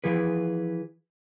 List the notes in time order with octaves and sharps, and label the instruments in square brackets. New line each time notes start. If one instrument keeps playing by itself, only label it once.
[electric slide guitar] E3 F3 G#4 B4